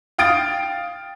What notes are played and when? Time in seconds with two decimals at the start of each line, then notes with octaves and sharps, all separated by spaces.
0.18 F5 G5 D#6 A6 D7